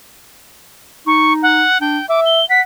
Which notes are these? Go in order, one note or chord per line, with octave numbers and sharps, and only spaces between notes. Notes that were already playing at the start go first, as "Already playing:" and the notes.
D#4 C#6
F#5
D4 G5
E5 D6
G7
F#5 B6